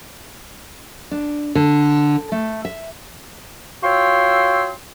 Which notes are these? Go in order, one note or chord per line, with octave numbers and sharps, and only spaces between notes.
D4
D3
A3
E5
F4 F#4 C#5 G5 C6 E6